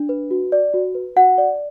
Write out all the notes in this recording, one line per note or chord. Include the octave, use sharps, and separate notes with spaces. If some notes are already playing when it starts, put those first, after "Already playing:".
Already playing: D4
B4
F#4
D5
F#4
B4
F#4 F#5
D5